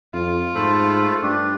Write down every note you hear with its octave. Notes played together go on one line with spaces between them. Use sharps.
F2 F4
G#2 A3 A4 C5 B5
G2 D4 G4